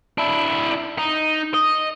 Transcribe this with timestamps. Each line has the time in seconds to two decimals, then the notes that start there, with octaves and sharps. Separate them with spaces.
0.18 D4 E4
0.98 D#4
1.54 D#5